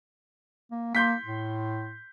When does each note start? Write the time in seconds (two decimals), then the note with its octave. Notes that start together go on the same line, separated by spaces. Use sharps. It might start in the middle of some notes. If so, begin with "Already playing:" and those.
0.71 A#3
0.95 A#3 C6 G6 B6
1.25 A2